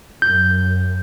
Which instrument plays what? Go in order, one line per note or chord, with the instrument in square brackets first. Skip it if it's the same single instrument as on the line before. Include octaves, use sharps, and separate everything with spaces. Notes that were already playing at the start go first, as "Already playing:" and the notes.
[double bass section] F#2 [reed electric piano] G6